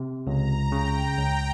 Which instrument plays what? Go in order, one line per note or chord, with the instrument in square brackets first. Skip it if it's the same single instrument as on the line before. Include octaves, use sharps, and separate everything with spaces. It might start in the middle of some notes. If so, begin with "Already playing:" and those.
Already playing: [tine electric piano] C3
[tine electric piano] C#2 [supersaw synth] A#5
[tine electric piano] C#3 [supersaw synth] G5
[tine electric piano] C#2